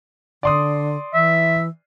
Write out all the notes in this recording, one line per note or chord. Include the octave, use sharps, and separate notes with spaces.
D3 D5 C6 D#6
E3 E5